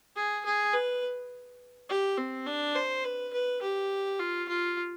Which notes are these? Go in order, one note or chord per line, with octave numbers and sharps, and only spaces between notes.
G#4
G#4
B4
G4
C4
D4
C5
B4
B4
G4
F4
F4